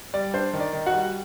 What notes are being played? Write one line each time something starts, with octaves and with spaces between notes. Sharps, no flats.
G3 D5
D4 C5
D#3
D5
D#3
F#4 F#5
G3